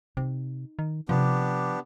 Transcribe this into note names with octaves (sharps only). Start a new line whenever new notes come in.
C3 D#4
D#3
C3 F3 B3 D4 G4